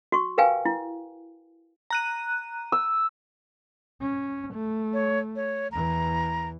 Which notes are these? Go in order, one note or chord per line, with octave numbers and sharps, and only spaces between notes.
F#4 C#6
G4 A#4 B4 F5 G5 G#5
E4
A#5 F#6 D#7
E6
C#4
A3
C#5
C#5
E2 E3 A#5